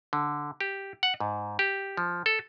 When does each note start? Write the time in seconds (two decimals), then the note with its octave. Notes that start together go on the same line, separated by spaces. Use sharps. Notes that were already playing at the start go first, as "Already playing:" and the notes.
0.13 D3
0.61 G4
1.03 F#5
1.20 G#2
1.59 G4
1.97 F3
2.26 A4